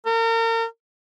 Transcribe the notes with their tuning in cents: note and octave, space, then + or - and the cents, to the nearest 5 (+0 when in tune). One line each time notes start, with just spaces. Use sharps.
A#4 -35